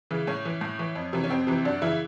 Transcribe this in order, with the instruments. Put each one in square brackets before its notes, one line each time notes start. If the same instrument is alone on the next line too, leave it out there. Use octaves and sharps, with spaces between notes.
[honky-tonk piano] C#3 E3
A2 C#4
E3
A2
E3
F2
C3 E3
C#4
F2 C4
C3 E3
F#2 D4
C#3 E3 E4